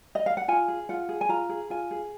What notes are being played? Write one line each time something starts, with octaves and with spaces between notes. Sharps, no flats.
D#5
F5
F#5
F4 G#5
G#4
F4 F#5
G#4
G#5
F4 A#5
G#4
F4 G#5
G#4